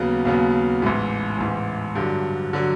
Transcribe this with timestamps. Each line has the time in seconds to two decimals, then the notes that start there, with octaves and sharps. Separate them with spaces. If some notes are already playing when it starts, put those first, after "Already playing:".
Already playing: D#2 C#3 F#3 B3
0.25 D#2 C#3 F#3 B3
0.82 A1 G#2 E3
1.38 A1 G#2 E3
1.96 G2 D3 F#3
2.53 D3 F#3